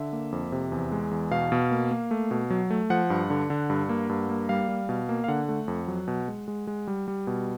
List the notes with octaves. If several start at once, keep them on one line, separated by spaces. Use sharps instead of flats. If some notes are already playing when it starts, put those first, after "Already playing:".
Already playing: D3 E5
A#3
F2
C3
E2
G#3
E2
B2 F5
B2
A#3
A#3
A3
B2
F#3
A3
F3 F#5
G2
D3
D3
G2
A#3
G2
A#3
G3 F5
G3
B2
A#3
F5
D3 F#5
A3
F2
F#3
B2
G#3
G#3
G#3
G3
G3
B2